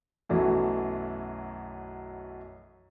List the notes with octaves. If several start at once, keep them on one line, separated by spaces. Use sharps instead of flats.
B1 F#2 E3 F#3 A3